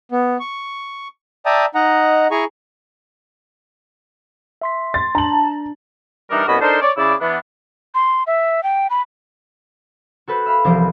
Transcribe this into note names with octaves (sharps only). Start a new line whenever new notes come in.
B3
C#6
D5 E5 G5 A5 A#5 D#6
D#4 D#5 F#5 A#5
E4 G#4 G#5 A#5 C#6
E5 C6 B6
C6 A6
D4 A5 A#5 F#7
E3 G3 D4 D#4 A#4
C2 B3 C#4 F#4 D#5 B5
D4 D#4 A4 A#4 C5
C#5 D5
C#3 E4 D5
E3 B3 D4
C6
E5
G5
B5
F#4 A4 B4 C5
E5 F5 B5
C2 E3 F3 B3 G4 C5